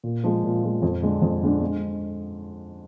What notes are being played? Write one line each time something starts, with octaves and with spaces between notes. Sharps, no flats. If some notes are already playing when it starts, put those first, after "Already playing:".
A#2
F3 G#3
A#2
F3 G#3
F2
D3 G#3 D4
F2
D3 G#3 D4
G#3